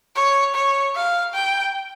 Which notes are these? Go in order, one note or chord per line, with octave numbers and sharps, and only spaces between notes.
C#5
C#5
F5
G5